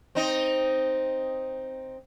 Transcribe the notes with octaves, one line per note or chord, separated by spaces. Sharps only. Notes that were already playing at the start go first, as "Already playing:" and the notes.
C4 D#4